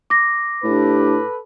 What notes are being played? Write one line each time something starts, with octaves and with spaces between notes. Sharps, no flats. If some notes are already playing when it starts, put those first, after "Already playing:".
D6 A#6
A2 D4 G4 A4 B4